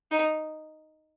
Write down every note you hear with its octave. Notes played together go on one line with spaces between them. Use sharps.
D#4